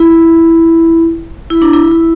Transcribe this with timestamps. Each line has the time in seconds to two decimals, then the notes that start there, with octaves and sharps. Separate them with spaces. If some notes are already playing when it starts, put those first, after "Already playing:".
Already playing: E4
1.50 E4
1.62 D4
1.73 E4
1.92 E4